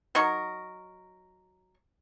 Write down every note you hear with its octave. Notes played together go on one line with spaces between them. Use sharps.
F#3 D#4 A#4 C#6